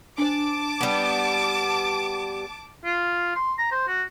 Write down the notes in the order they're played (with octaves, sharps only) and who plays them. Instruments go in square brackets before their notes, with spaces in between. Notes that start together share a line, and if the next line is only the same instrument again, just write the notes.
[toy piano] D4 C5 [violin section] A5 D6
[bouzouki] G3 B3
[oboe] F4
C6
A#5
C5
F#4